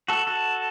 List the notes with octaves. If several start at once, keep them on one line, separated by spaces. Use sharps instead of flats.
F#4 A4
F#4 A4